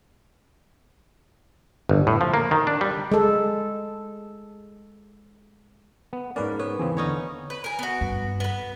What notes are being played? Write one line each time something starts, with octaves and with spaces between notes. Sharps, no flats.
G1
A2
F3
A#3
D#3
D4
G3
G#3 A4
B3
G#2 A#3 C#4 B4 D5
B3 C#5
E2 C#3 C4 G#4
D3 C#4 D#4 C#5
B4
A#4 G#5
B3 F#4
G2
B3 B4